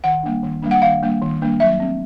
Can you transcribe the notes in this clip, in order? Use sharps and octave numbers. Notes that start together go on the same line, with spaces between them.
D#3 F#5
G3 A#3 D4
D#3
G3 A#3 D4
F#5
D#3 F5
G3 A#3 D4
D#3
G3 A#3 D4
F#3 E5
A3 C4